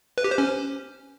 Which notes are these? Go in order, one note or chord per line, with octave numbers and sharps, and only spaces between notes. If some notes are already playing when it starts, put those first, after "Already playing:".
B4
G4
C5
C#4